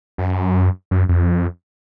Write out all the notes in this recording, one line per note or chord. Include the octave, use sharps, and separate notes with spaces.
F#2
F#2
F2